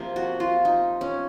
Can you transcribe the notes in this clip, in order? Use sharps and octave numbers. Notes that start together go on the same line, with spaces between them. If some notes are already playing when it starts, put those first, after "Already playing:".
Already playing: C3 F3 A#3
F#4
F4
D#4
C#4